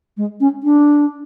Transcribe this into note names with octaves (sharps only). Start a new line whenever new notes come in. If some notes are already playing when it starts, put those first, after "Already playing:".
G#3
C#4
D4